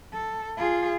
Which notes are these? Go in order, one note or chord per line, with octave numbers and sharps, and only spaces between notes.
A4
F4 G#4